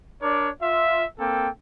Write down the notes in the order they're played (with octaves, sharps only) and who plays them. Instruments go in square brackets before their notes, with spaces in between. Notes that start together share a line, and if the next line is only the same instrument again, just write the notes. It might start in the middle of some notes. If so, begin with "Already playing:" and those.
[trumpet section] D4 A#4 C#5 D5
F4 E5
A#3 C4 A4 G5